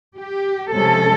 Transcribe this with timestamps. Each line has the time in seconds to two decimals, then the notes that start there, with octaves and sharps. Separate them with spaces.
0.17 G4
0.72 C3 F3 G#3 C#4 A4